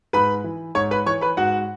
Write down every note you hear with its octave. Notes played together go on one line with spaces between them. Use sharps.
G#2 B4 B5
E3
G#2 C#5 C#6
B4 B5
E3 C#5 C#6
B4 B5
G#2 F#4 F#5